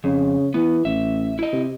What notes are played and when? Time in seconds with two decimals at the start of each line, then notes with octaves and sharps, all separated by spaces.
0.04 F2 C#3
0.54 E3 B3
0.85 A1 E5
1.39 E4 D#5
1.53 C3